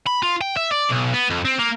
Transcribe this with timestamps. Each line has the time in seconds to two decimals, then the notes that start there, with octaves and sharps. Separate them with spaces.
0.07 B5
0.23 F4
0.41 G5
0.57 E5
0.72 D5
0.90 B1
1.14 B3
1.30 F2
1.45 C4
1.58 A#3